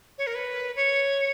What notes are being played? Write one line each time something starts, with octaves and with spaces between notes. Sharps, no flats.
C#5
A#4
B4
C#5